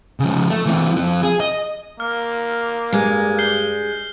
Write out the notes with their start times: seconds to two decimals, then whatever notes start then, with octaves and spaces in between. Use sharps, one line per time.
0.20 C#3 F3
0.49 A3
0.66 E3 C4
0.93 F3 C4
1.23 G#4
1.40 D#5
2.00 A#3 F6
2.93 G2 G#3
3.38 G6 C7 G7